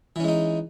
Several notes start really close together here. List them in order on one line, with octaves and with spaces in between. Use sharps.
E3 C#4 G#3 D#4